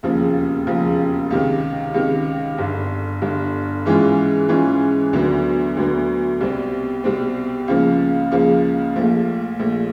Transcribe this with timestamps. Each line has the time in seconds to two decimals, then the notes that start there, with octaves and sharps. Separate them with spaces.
0.03 E1 D#2 C#3 F3
0.67 E1 D#2 C#3 F3
1.31 C#2 C3 D#3
1.94 C#2 C3 D#3
2.58 G1 G2 D3
3.22 G1 G2 D3
3.86 G#2 E3 G#3 C#4 F4
4.49 G#2 E3 G#3 C#4 F4
5.13 D2 D3 F#3 B3
5.77 D2 D3 F#3 B3
6.41 C2 B2 G3 C4
7.04 C2 B2 G3 C4
7.68 C#2 C#3 F3 A#3
8.32 C#2 C#3 F3 A#3
8.96 A#1 A#2 F3 A3
9.59 A#1 A#2 F3 A3